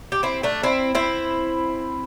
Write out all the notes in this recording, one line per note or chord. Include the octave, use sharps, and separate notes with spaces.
G4
C4 E4
A3 D4
C4 E4
C4 E4